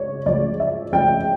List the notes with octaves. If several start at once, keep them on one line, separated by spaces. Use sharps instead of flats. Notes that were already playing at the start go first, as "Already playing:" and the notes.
Already playing: C#2 C#3 C#5 D5
C#2 C#3 F3 A3 D5
E5
C#2 C#3 F3 A3 G5